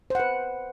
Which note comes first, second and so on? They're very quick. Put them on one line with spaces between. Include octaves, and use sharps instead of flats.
C5 F#5 B4